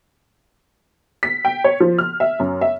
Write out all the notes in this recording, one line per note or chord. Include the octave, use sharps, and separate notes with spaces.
B6
G5
C#5
F3
F6
E5
F#2
E5